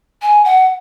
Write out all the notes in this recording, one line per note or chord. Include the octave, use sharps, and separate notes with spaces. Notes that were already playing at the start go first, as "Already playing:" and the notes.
G#5
F#5